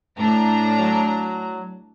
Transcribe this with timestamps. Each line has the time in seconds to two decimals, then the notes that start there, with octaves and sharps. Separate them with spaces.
0.18 A2 D4 A#5
0.78 F#3